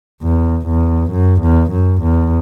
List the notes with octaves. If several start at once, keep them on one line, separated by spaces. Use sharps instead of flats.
E2
E2
F#2
E2
F#2
E2